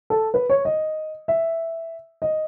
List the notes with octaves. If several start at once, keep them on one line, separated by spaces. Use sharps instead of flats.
A4
B4
C#5
D#5
E5
D#5